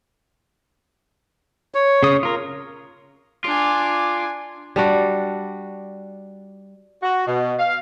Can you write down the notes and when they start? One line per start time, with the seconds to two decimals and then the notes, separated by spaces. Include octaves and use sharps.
1.74 C#5
2.03 C#3 D#6
2.23 F4 A#4
3.44 D4 F4 G#5 D6
4.76 G3 D4 F#4
7.03 F#4
7.27 B2
7.59 F5